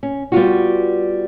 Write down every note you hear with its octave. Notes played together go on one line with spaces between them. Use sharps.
C#4
G3 B3 F4 F#4